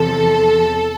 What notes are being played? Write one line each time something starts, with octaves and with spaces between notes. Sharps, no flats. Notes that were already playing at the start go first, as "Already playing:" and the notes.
Already playing: E2 C3 F3 A4